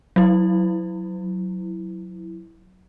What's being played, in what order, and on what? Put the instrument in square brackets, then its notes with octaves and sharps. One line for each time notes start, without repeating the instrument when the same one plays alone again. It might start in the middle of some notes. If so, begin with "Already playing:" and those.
[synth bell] F#3 E4